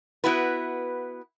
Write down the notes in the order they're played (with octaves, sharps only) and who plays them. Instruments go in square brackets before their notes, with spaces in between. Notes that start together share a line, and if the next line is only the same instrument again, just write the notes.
[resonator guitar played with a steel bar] B3 E4 F#4 B4